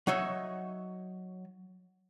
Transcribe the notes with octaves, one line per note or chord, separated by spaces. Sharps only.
F#3 D#4 C#5 E5